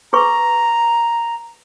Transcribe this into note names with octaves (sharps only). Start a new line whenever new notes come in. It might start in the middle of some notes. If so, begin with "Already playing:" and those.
G#4 B4 A#5 C#6